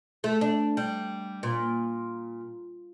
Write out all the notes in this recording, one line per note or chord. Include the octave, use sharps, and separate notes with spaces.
A3
D4
G3
A#2